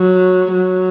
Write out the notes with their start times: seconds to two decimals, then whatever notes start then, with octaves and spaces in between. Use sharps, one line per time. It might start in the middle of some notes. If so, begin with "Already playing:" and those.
Already playing: F#3
0.55 F#3